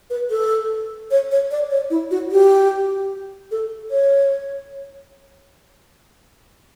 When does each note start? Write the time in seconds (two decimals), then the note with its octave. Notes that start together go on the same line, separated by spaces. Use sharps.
0.10 B4
0.30 A4
1.11 C#5
1.31 C#5
1.51 D5
1.71 C#5
1.90 E4
2.11 F#4
2.32 G4
3.51 A4
3.91 C#5